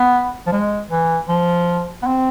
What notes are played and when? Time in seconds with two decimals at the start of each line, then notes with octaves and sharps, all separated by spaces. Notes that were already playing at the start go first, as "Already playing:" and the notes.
Already playing: B3
0.47 F3
0.52 G#3
0.91 E3
1.29 F3
2.03 B3
2.06 C4